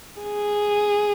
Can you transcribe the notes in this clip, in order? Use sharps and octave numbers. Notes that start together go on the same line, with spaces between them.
G#4